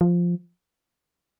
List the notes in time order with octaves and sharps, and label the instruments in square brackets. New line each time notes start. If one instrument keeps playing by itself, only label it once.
[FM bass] F3